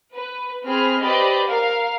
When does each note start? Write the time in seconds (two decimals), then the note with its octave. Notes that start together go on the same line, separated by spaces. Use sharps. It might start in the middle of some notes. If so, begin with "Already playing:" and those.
0.15 B4
0.67 C4 G#4 B5 F6
1.02 G4 B4 C5 D5 D#5 B5
1.46 A#4 F5